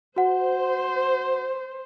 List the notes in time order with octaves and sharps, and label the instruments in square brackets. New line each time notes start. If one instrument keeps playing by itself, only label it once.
[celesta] F#4 F#5 [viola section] C5